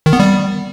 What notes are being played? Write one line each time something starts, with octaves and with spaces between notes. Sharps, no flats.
D#3
B3
G3